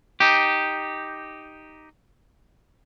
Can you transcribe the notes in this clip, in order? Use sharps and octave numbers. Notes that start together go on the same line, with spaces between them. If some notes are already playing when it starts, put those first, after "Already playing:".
D#4 G4